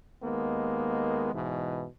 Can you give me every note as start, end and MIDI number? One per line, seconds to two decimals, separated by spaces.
0.23 1.34 39
0.23 1.34 56
0.23 1.34 58
0.23 1.34 59
1.34 1.85 44
1.34 1.85 47
1.34 1.85 52